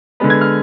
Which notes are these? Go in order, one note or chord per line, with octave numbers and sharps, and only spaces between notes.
D3 G#3 B3
G#6
F6